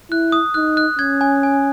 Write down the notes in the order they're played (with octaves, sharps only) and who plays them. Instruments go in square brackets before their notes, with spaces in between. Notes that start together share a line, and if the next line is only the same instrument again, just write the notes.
[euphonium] E4 [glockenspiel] F#6
[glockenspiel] D#6
[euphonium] D#4 [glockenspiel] F#6
[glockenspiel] F#6
[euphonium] C#4 [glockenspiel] G#6
[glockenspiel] G#5
G#5